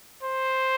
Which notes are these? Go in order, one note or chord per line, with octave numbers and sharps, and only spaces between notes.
C5